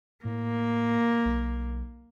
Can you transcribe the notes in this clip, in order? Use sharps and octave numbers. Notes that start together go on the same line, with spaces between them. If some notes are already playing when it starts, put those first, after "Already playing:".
A2 A#3
B1